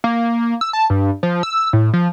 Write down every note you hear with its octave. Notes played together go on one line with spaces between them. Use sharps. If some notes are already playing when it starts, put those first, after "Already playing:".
A#3
E6
A5
G2
F3
E6
A2
F3